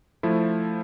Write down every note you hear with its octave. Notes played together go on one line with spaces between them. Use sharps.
F3 A3 E4